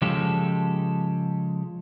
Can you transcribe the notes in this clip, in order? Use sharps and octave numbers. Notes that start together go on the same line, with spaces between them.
C#3 F3 G#3 G4 A4